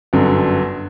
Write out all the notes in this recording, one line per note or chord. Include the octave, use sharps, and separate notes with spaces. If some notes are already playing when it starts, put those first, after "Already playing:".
G1 F#2 D3